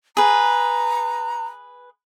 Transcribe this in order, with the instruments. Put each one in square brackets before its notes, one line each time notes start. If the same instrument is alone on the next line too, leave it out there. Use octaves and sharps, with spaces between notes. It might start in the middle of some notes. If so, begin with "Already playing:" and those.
[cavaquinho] G#4 B4 [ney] A#5